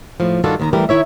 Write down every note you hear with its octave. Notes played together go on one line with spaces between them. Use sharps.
A2 F3
G2 D#3 D4 F4 F#4 A4
D#2 D#3 A#5
E3 G3 A3 G4 A#4
D#3 E4 C#5 E5